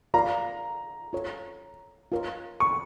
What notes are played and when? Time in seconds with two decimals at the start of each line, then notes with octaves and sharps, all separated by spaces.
0.14 F4 A#4 D5 F5 A#5
1.13 F4 A4 C#5
2.12 F4 A#4 C#5
2.60 C#6